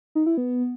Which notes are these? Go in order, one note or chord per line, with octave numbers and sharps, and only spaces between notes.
D#4
E4
B3